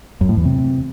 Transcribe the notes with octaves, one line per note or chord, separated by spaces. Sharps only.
F#2
A2
E2
C3